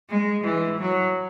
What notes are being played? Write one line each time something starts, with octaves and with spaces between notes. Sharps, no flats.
G#3
E3
F#3